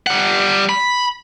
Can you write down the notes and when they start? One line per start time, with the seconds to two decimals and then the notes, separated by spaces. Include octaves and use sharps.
0.07 G3 F#5
0.69 B5